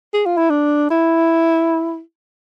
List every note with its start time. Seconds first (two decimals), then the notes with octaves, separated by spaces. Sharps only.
0.14 G#4
0.26 F4
0.37 E4
0.50 D4
0.90 E4